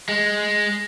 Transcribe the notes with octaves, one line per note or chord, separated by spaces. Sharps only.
G#3